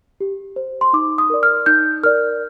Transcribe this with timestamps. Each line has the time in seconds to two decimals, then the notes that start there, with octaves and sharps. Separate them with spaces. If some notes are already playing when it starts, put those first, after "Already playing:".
0.21 G4
0.56 C5
0.81 C6
0.93 D#4 D6
1.18 D#6
1.30 A#4 D5
1.43 F6
1.66 D#4 G6
2.04 A#4 D5 F6